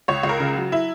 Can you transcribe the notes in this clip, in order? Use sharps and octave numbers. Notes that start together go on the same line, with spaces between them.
C#2 C#5
C#2
A#4
C#3
F#3
E4